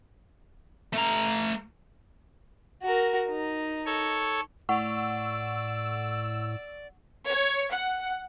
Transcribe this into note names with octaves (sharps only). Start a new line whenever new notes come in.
A3 A#5
F#4 A#4
D#4
A4 C#5
A2 D5 F#5 C#6 E6
C#5
F#5